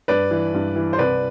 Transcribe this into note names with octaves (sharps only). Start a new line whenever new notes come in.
G2 B4 D5
E3
G2
E3
C5
C2 B4 D5